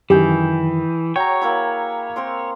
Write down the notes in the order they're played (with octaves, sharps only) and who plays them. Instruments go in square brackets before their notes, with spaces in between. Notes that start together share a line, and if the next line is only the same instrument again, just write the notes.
[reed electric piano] F#2 D#3 [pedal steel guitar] E3 [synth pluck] G4 [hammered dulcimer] G#4 G5
[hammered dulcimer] F#3 [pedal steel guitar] C#5 [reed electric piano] G5 A#5
[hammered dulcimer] A#3 E4 B5
C4 A#4 C6